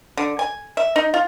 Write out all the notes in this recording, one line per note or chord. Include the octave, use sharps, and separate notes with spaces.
D3
G#5
E5
D#4
F4